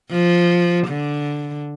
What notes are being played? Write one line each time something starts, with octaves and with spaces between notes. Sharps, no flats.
F3
D3